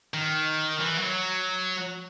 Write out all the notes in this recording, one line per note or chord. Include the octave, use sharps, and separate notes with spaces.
D#3
E3
F#3